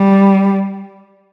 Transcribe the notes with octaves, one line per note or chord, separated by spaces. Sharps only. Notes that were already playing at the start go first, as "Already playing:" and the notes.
Already playing: G3